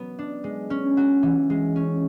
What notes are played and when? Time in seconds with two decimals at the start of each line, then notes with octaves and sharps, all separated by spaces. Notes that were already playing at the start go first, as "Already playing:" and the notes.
Already playing: F#3 B3
0.19 D4
0.44 G#3
0.70 C#4
0.97 F#4
1.23 E3
1.50 G#3
1.76 C#4